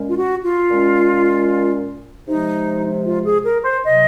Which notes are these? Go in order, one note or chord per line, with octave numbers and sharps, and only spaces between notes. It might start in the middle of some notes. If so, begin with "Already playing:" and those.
Already playing: A#2 G#3 C#4
F4
F#4
F4
A#2 G#3 C#4
C3 F3 G#3 D#4
F4
G#4
A#4
C5
C3 F#3 D#5